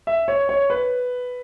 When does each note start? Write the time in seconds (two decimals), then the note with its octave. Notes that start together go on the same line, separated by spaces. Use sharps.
0.07 E5
0.28 C#5
0.49 C#5
0.70 B4